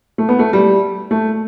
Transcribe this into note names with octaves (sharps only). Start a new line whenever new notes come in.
A3
B3
A3
G3
A3